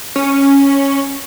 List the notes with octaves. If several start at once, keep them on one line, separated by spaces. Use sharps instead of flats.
C#4